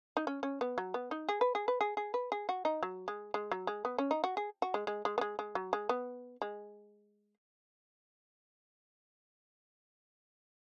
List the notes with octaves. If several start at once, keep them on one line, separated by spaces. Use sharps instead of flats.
D#4
C#4
C#4
B3
F#3
B3
D#4
G#4
B4
G#4
B4
G#4
G#4
B4
G#4
F#4
D#4
F#3
G#3
G#3
F#3
G#3
B3
C#4
D#4
F#4
G#4
F#4
G#3
G#3
G#3
B3
G#3
G#3
F#3
G#3
B3
G#3